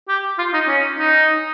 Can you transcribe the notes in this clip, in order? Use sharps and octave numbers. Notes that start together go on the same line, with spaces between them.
G4
F4
D#4
C#4
D#4